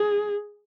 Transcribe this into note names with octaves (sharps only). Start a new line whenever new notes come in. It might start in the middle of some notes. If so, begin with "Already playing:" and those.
Already playing: G#4